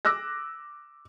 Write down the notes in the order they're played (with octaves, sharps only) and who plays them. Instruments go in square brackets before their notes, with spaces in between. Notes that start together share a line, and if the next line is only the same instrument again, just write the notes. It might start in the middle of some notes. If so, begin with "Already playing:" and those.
[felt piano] D6 E6 F#6 A#6